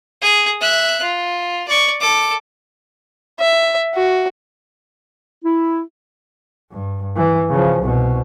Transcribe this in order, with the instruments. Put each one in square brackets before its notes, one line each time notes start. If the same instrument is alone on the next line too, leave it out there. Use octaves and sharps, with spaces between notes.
[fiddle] G#4
E5 F#6
F4
D5 C#6
A4 D6
[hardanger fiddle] E5
F#4
[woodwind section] E4
[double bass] G2
E3
C#3 F3
C2 B2